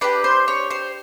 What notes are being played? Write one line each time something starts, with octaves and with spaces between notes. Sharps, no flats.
D4 G4 B4
C5
C#5
C5